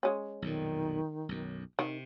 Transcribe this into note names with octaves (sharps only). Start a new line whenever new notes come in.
G#3 C#4
B1 F2 A#2 D#3
B1 F#2
C3 D#3